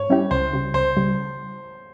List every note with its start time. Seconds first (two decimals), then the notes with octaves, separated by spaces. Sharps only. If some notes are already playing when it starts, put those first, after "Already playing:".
Already playing: G#2 C#5
0.10 G3 C#4 E4 G4
0.31 C#2 C5
0.53 C#3 G3
0.74 C#2 C5
0.97 C#3 G3